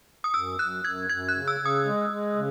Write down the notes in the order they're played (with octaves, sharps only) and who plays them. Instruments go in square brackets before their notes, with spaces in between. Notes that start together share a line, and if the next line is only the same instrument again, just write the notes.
[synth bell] D#6
[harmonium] F#2 [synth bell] E6
[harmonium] F#2 [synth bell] F#6
[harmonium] F#2 [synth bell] G#6
[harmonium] F#2 [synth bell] G#6
[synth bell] F#6
[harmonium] C#3
[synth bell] E6
[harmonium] C#3
[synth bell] D#6
[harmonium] G#3
G#3
C#3